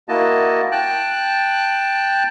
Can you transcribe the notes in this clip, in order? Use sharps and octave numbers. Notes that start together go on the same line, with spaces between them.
A#3 E4 F#4 D#5 A5
G5 A5 F#6